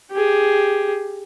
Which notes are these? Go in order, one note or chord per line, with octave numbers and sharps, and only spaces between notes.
G4 G#4